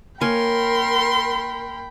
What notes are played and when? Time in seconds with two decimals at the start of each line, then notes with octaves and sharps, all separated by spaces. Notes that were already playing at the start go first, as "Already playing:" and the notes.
0.21 A#3 A#4 C#5 G5 G#5 B5 C6